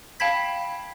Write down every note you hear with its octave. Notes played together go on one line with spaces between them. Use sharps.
F5 G5 A5 B5 G#6 B6